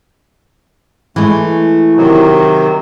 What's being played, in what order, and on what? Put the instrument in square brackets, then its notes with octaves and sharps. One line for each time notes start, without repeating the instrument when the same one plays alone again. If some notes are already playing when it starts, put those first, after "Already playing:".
[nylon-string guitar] E3 G#3 [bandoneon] A3
[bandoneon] C3 D#3 F#3